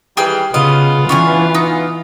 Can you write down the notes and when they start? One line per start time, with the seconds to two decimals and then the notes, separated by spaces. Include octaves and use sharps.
0.17 D#3 E3 G3 G#4 G5 F6
0.54 C#3 B3 F4 D#5
1.09 E3 C#4 D4 G#5
1.54 D#4